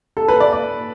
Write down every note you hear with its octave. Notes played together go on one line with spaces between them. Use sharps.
A4
B4
D5
D5